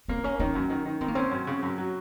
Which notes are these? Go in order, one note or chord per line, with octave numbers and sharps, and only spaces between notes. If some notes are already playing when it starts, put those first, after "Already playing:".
A#3 C4
A#3 C#4
D#3 C#4
F#2
D#3
D#3
D#3 C4
A#3
C4 C#4
F#2
C#3
F#2
F#3